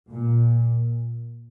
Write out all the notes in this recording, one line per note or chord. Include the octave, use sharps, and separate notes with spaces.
A#2